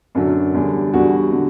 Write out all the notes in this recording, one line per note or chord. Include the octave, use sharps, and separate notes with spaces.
F#2 D3 F#3 D4
E2 D3 G3 D4
E2 D3 G3 F#4
D3 G3